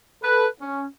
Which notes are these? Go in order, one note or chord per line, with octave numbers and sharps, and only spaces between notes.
A4 B4
C#4